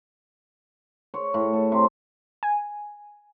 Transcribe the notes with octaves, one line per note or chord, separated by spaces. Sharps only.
C#5
A2
A4
C3
G#5